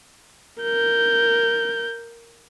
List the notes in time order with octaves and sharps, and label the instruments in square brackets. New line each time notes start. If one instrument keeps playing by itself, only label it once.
[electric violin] A#4 G6